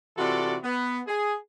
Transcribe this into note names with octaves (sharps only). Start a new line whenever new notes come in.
C3 E3 F4 F#4 A4 D5
B3
G#4